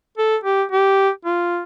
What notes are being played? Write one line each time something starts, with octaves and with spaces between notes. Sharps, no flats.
A4
G4
G4
F4